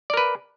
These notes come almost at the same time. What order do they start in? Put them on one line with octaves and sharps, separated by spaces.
D5 A#4 B4